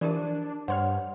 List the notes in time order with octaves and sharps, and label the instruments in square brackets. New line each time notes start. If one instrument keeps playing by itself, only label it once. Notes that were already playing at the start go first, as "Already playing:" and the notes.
[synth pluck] E3 F3 D#7 [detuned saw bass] D4 [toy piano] G4 A#4 D5
[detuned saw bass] G2 [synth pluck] C5 C#5 F6 [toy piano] F#5 C6